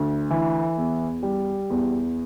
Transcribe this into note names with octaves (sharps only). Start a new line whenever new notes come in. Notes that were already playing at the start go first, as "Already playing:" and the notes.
Already playing: D2
E3
E2
G3
E2